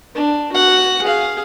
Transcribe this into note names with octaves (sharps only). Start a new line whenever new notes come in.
D4
F#4 F#5
G#4 F5